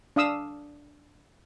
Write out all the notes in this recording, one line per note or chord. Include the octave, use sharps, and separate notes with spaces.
D4 F5 D#6 E6